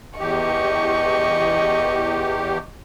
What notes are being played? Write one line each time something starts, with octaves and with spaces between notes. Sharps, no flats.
E2 G4 D#5 C#6